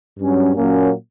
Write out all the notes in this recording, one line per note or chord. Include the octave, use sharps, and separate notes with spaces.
G2 F#3 C#4
A#2 F#3 A#3 C#4